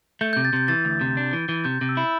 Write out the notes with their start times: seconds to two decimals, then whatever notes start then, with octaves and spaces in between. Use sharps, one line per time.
0.21 A3 G6
0.33 C3 G6
0.45 A6
0.53 C3 G6
0.68 E3 A6
0.85 D2
1.01 C3
1.17 D4
1.33 E3
1.49 E3
1.64 C3 G6
1.81 C3
1.89 E6
1.97 E4